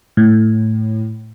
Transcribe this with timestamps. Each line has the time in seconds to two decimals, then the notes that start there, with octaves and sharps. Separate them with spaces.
0.17 A2